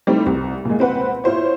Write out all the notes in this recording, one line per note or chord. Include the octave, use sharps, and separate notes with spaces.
G3 A3 C4 D#4 E4
C2
A#2 G#3
C4 B4 F#5
E4 F4 C5 C#5